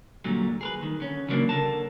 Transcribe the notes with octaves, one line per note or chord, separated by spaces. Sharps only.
A#2 D3 F#3 G3
G#4 A#4 B4
D#3
D3 C#4
C#3 E3 F#3 G3 A#3 D4
D3 A#4 A5